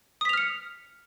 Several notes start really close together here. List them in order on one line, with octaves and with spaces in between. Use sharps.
D#6 B6 F7 F6 C#7